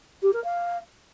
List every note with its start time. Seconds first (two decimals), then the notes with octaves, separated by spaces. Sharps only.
0.23 G4
0.33 A#4
0.44 F5